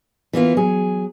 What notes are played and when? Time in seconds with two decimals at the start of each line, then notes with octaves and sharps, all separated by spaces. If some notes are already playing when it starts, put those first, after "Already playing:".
0.33 E3 A#3 B3 F4
0.57 F#3 G#4